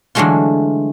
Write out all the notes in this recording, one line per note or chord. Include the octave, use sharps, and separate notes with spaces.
D3 E3 F#3 G#3 A3 F4